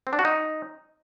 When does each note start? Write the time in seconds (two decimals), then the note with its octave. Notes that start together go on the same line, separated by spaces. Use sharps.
0.07 C4
0.13 D4
0.19 F#4
0.25 D#4